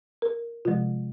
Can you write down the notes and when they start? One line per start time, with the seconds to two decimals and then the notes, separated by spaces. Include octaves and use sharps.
0.22 A#4
0.65 C3 F3 G#3 F4